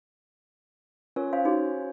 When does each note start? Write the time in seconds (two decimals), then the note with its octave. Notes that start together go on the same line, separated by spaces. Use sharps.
1.16 C#4 F4 A#4 C#5
1.33 C#4 C5 C#5 F5
1.45 D#4 F#4 G#4